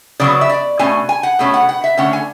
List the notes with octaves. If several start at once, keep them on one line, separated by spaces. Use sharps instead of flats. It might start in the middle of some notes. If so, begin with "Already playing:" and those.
C#3 F#3 B3 D5
E5
D5
B2 A3 C#4 G#5
G#5
F#5
B2 A3 C#4
F#5
F#5
E5
D3 A3 C#4 F#5
G#5